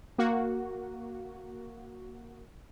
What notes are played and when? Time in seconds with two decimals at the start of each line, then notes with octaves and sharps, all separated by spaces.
0.18 A#3 F#4